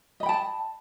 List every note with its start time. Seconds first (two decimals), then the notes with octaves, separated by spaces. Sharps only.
0.20 D#5
0.23 B5
0.26 G5
0.29 A5